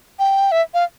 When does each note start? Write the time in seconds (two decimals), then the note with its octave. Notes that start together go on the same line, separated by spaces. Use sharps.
0.19 G5
0.52 E5
0.74 F5